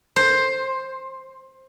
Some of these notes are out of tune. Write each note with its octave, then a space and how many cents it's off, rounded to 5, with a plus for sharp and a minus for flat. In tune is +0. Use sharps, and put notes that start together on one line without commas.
C5 +10